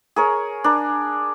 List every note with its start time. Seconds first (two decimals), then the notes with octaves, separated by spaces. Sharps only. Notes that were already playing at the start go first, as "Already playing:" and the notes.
0.16 G#4 A#4 C#5
0.64 D4 A#4